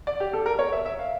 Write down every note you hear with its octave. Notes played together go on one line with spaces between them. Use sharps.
D5
G4
A4
A#4
C#5
E5
E5
F5